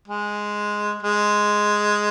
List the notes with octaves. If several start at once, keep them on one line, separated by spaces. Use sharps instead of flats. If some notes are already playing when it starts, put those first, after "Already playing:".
G#3
G#3